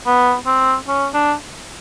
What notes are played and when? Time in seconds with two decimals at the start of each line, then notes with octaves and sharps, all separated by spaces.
0.07 B3
0.46 C4
0.88 C#4
1.14 D4